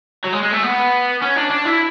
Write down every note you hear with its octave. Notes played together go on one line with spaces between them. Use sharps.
F#3
G#3
G#3
A3
B3
C#4
D4
D4
E4